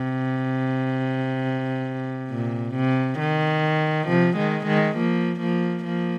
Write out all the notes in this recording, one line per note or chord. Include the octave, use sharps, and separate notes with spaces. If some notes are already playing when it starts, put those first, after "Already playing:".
Already playing: C3
A#2
C3
D#3
C3 F3
D#3 G#3
D#3 G#3
F3 A#3
F3 A#3
F3 A#3